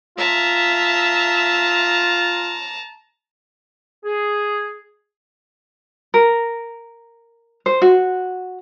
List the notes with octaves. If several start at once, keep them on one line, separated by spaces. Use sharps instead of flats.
F4 E5 A5 A#5
G#4
A#4
C5
F#4